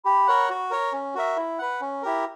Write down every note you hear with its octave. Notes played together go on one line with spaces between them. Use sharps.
G4 B5
A#4 C#5 F#5
F#4
A#4 C#5
C#4
F#4 A#4 E5
E4
B4 F#5
C#4
E4 G4 A#4